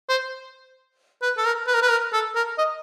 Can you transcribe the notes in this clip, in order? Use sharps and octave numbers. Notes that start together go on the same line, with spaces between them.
C5
B4
A4
A#4
B4
A#4
B4
A#4
A4
A#4
D#5